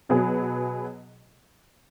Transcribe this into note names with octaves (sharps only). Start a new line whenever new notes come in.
B2 F#3 B3 G#4